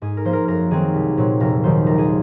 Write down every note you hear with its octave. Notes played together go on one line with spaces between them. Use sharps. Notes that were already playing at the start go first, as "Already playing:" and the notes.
G#2 G#4
A#4
F3 A#3 C5
A#4
F#2 A#4
D#3 F#3 C4 G#4
C2
A#2 F#3 C4
F1 A#4
D#2 D#3 F#3 C5
A#1 A#4
G#4